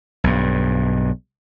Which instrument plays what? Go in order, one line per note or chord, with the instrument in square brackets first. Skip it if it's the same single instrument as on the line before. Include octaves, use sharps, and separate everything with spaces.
[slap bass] B1 G2